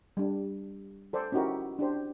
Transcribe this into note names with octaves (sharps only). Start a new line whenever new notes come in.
G3 D4
A4 C5 D5
C#4 D#4 E4 F#4 G4 A#4
D4 G4 C5